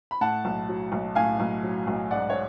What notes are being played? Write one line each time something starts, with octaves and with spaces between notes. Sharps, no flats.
B5
A2 F#5 A5
B1
F#3
B1
A2 F5 G#5
B1
F#3
B1
G#2 D5 F#5
C#5